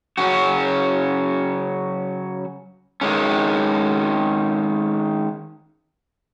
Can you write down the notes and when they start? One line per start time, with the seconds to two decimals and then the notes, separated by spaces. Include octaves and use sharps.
0.18 C#3 F#3 C#4 F#4
3.01 D#3 G#3 C#4